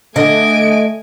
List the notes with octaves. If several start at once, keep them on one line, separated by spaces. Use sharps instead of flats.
D3 A3 D#5 G#5 D7